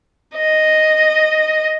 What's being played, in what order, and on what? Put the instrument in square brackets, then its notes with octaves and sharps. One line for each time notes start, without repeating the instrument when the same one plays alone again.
[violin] D#5